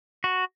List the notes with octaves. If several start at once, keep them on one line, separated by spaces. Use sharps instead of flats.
F#4